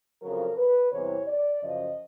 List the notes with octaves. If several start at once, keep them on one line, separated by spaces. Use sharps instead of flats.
F2 C#3 F#3 A#4
B4
E2 C3 E3 G3 C#5
D5
F#2 C#3 F3 D#5